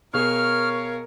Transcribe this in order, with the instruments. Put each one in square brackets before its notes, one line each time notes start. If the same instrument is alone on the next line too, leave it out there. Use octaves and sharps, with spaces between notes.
[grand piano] B2 G#4 [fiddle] A#4 [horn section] C#5 F5 [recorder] F6